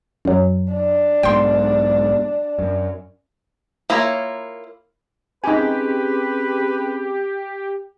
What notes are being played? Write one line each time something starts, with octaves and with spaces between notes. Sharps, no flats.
F#2 F#3
D4
B1 G#2 B2 G5 C6
F#2
A#3 E4 F4 A#4 C#5
C4 C#4 D#4 G4 G#4 B4 G#5